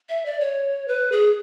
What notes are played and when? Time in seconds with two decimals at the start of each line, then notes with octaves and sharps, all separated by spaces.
0.09 E5
0.26 D5
0.40 C#5
0.88 B4
1.12 G#4